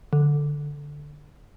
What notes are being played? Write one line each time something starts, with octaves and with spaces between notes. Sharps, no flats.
D3